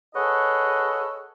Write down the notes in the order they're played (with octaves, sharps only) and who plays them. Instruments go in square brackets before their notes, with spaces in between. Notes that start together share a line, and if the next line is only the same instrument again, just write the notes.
[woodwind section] G#4 A4 B4 C#5 D#5 F#5